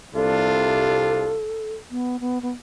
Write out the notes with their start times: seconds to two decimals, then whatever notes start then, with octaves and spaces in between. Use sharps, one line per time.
0.14 C2 C3 G3 D4 F4 A4
1.91 B3
2.20 B3
2.42 B3